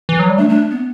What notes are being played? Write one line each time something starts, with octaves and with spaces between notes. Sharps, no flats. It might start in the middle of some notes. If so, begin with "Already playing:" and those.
E3
F#3
G3
A3 D4
D4
B3